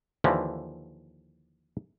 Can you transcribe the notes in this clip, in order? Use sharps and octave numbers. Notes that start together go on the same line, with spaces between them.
D#2 D3 E3 F3